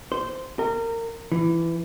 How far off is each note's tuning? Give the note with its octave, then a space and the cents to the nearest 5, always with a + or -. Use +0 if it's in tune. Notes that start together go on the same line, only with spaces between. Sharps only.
C5 -10
A#4 -25
E3 +15